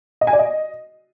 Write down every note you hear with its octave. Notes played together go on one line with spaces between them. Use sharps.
D#5
G#5
D5
D#5